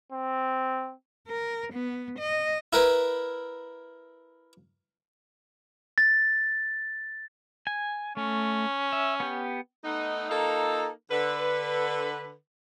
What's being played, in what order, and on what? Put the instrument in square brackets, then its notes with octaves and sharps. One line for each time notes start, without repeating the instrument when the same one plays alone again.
[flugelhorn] C4
[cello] A#4
B3
D#5
[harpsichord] E4 A#4 B4
[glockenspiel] A6
[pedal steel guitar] G#5
[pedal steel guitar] A3 [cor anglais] C#4
[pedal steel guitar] E5
B3 G4
[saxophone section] A3 B3 D#4
A#3 D#4 F4 A4
D3 B4